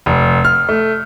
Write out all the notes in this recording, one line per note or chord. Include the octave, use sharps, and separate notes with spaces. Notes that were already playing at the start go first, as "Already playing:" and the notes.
F1
F6
A3